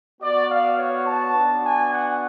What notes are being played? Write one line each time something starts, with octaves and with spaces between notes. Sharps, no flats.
B3 F#4 D5
F5
C#5
A5
B3 D4 F#4
G#5
F#5